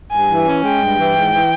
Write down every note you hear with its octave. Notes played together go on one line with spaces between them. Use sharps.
G2 G#5
E3
C#4
G#3 G5
G2
E3
G#2
E3